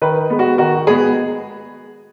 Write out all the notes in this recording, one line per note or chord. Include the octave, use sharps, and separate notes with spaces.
D#3 B4
G#3 B3
F#4
D#3 F#4
G#3 B3 G#4